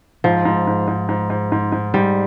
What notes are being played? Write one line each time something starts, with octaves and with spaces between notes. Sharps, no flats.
G#2 F3
G#2
G#2
G#2
G#2
G#2
G#2
G#2
G#2 G3